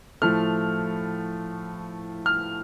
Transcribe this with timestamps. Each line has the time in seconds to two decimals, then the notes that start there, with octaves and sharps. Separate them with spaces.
0.22 A2 F3 A3 F6
2.26 F6